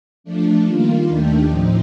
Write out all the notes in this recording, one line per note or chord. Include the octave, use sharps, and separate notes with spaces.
F3 A3 D4
D#3 G3 A#3 F4
D#2 D#3 A3 D4 G4
A2 F3 C4 D#4